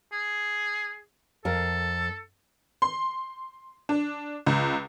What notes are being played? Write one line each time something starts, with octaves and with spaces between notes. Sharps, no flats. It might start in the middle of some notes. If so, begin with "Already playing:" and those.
G#4
F2 A4 A#4 F5
C6
D4
C#2